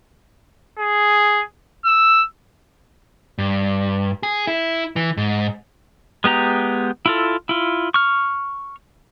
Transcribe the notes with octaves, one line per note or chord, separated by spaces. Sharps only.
G#4
E6
G2
G#4
E4
E3
G#2
G#3 B3 G4 A#5
E4 F4 A4
E4 F4
C#6 F6